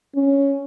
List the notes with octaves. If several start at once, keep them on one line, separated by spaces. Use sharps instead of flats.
C#4